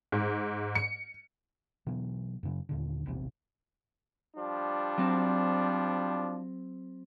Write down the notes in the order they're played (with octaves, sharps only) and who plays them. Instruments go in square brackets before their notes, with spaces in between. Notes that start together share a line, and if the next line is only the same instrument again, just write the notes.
[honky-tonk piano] G#2
C#7
[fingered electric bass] B2 E3 F#3
F#2 C#3 F#3
D#2 A#2 D3
E1 A#1 E2 C3
[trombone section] F3 G3 D4
[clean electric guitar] F#3 C4